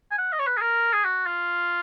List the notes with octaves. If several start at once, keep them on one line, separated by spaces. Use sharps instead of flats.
G#5
F#5
D#5
C#5
B4
G#4
A#4
G#4
F#4
F4